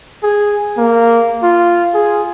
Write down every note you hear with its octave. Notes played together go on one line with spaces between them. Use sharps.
G#4
A#3
F4
G#4